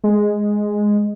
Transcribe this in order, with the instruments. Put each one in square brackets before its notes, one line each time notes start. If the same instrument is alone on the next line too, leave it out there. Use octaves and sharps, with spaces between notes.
[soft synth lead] G#3